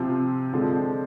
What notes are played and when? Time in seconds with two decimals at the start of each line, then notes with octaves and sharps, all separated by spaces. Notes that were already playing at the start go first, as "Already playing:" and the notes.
Already playing: C3 F3 C4
0.53 D3 F3 G#3 C4